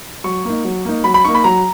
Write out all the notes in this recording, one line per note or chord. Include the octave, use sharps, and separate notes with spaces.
F#3 C#6
A#3 D#4
F#3
A#3 D#4
F#3 B5
B5
A#3 D#4 C#6
B5
F#3 A#5